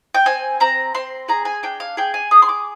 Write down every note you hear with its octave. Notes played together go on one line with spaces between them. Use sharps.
G5
C4 G#5
C4 A#5
C4 C6
G#4 A#5
G#5
D4 G5
F5
G#4 G5
G#5
G#4 D#6
C6
D6